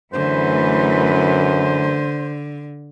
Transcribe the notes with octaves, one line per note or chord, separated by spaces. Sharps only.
F#2 D3 E3 A3 B4 C5